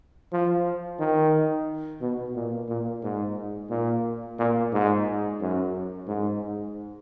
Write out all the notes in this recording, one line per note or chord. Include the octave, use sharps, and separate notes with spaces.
F3
D#3
B2
A#2
A#2
G#2
A#2
A#2
G#2
F#2
G#2